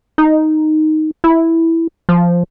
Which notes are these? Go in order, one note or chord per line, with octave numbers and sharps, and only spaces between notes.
D#4
E4
F3